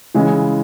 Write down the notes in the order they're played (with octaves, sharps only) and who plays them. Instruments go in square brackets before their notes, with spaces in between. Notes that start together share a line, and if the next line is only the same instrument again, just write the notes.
[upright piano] C#3 E3 G#3